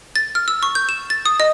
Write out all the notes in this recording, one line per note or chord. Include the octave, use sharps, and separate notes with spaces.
A6
F6
E6
C#6
G6
E7
A6
D#6
D#5